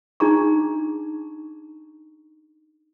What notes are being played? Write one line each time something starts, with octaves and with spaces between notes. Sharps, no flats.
D4 D#4 G#4 A#5 C#6